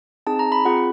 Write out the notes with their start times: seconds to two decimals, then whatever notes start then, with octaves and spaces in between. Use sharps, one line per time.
0.27 C4 D#4 G#4 A5
0.39 A#5
0.52 B5
0.65 C4 F4 G#4 F#5